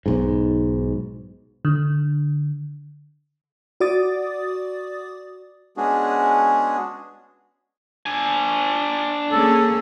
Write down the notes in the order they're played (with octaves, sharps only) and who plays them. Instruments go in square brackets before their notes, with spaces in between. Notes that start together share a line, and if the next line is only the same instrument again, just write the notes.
[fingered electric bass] B1 G#2
[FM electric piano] D3
F#4 D5 D6 D#6 A6
[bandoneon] G#3 B3 C#4 D4 F#4 G#4
[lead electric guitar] D4 G#5
[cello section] A#3 C#4 G#4 [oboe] A4